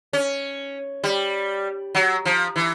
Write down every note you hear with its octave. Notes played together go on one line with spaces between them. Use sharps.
C#4
G3
F#3
F3
E3